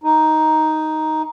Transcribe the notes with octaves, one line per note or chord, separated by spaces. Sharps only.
D#4